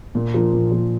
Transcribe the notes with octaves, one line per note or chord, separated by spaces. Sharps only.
A#2
F3 A#3 F4
A#2
F3 A#3 F4